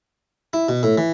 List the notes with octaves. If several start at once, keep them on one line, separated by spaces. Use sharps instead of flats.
E4
B2
A2
E3